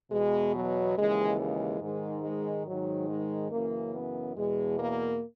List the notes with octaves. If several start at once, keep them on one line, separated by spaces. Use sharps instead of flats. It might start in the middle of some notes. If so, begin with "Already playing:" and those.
E2 B2 G#3
F#3
D#2 C#3 E3 G#3
G#3
G#2 D#3 G#3
G#3
G#2 D#3 F#3
G#3
F#2 C#3 E3 A#3
B3
E2 B2 G#3
A#3